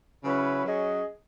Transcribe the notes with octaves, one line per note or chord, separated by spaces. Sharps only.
C#3 F#3 C#4 E4 B4
F#3 C#4 G#4 D#5